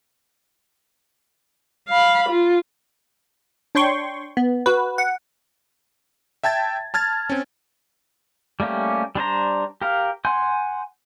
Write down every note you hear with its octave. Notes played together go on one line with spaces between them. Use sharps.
F5 B5
F4
D4 C#5 G5 C6 C#6
B3
F#4 B4
F#5
E5 G5 A5 G#6 A6
A5 F6 G#6 A6
C4 C#4
G3 A3 A#3 C#4 G4
G3 D4 C5 A#5
G4 A#4 F5
F#5 G#5 C6 G6